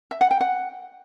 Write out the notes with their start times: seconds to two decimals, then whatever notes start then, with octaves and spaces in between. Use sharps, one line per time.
0.11 E5
0.21 F#5
0.31 G5
0.41 F#5